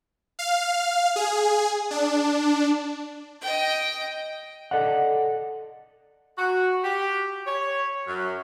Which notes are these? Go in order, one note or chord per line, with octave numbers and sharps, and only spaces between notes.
F5
G#4
D4
D#5 G5
A4 D5 D#5 F#5
F#4
G4
C#5
F#2